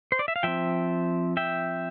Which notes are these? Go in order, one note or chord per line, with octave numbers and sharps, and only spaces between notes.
C5
D5
E5
F5
F3 C4 E5 G5
E5 G5